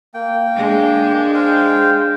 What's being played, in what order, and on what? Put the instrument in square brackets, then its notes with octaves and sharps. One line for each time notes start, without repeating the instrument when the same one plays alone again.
[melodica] A#3 G5
[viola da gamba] G#3 D4
[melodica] C5 F5 G5